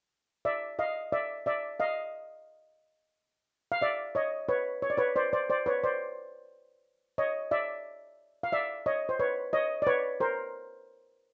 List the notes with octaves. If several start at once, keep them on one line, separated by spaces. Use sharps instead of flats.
D5 E5
D#5 F5
D5 E5
D5 E5
D#5 F5
F5
D5 E5
C#5 D#5
B4 C#5
C#5
D5
B4 C#5
C5 D5
C5 D5
C5 D5
B4 C#5
C5 D5
C#5 D#5
D5 E5
F5
D5 E5
C#5 D#5
C5
B4 C#5
C#5 D#5
D5
B4 C#5
A#4 C5